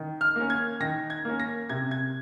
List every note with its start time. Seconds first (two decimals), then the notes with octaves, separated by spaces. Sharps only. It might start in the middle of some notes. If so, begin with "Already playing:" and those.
Already playing: D#3
0.21 F6
0.36 A#3 C#4
0.50 G#6
0.80 D#3 A#6
1.10 G#6
1.25 A#3 C#4
1.40 A#6
1.69 C3 G#6
1.91 G#6